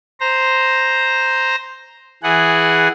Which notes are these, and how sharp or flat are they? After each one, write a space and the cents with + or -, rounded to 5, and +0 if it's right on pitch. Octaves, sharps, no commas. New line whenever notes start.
C5 +0 A#5 +0
E3 +0 G#4 +0 F#5 +0